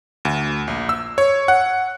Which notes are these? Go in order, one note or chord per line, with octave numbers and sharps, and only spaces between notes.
D2
A#1
E6
C#5
F#5